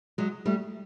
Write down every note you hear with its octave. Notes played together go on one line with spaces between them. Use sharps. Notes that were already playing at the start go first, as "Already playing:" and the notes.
F#3 G#3
G3 A3